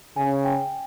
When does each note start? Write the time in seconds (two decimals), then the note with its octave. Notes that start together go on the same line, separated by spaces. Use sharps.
0.16 C#3 G#5
0.44 G5